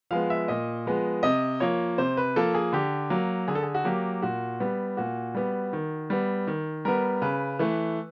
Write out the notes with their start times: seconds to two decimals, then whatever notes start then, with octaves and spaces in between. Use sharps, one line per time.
0.11 F3 G#3 B3 F5
0.30 E5
0.48 A#2 D#5
0.86 F3 G#3 B3
1.23 C3 D#5
1.60 F3 A#3 C#5
1.98 C3 C5
2.17 B4
2.36 F3 A#3 A4
2.55 G#4
2.73 D3 G4
3.10 F#3 A#3
3.48 D3 G#4
3.55 A4
3.63 G#4
3.74 F#4
3.85 F#3 A#3 G4
4.22 A#2 F#4
4.60 G3 B3
4.97 A#2 F#4
5.35 G3 B3
5.73 D#3
6.10 G3 B3
6.47 D#3
6.85 G3 B3 A#4
7.22 C#3 B4
7.59 E3 A3